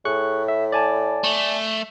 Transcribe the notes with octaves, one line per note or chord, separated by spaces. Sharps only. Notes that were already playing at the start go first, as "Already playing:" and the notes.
A2 G#4 C#6 F#6
E5
D5 G#5 A5
A3